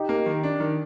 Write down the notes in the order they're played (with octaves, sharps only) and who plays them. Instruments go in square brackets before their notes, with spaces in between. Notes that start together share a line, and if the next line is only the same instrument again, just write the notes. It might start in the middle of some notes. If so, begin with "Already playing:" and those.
Already playing: [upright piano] D#4 G4
[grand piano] A#3
D#3
D4
D#3